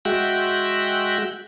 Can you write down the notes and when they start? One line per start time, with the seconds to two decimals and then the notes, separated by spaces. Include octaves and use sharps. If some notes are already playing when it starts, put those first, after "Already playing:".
0.05 G#3 F#4 E5 G5 F#6